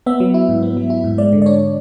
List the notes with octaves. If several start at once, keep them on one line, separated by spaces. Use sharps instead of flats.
B3 E5
F#3
E4
G#2
B3
F#3
E4
G#2
G#3 D5
D3
D5
D4 C#5